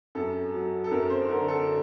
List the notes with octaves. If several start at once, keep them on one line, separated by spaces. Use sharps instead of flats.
F#2 A4
F#3
A4
F#2 A#4
C5
D3 A#4
A4